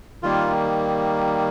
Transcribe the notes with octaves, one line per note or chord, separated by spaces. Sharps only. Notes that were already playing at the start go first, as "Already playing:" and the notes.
D#3 G3 A#3 F4